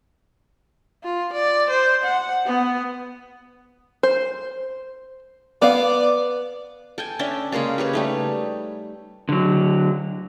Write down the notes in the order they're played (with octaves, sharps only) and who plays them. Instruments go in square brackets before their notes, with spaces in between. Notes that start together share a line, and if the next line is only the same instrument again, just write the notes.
[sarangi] F4
D5
C5
F#5
B3
[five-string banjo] C5
[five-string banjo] B3 F5 [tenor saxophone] D5
[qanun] A4 G5 G#5
C#4 D4 E5 G5
C#3 G#3 A#3 C#4
G4 B4 C#5
G3 A3 D#4
[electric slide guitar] D3 F#3